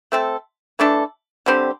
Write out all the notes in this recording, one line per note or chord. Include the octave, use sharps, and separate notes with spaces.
A3 C4 A4
E3 A3 D4 A4
D3 G3 C4 G4